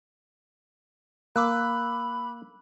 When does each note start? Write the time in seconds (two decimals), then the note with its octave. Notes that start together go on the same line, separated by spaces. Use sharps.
1.36 A#3 B5 D6 E6 F#6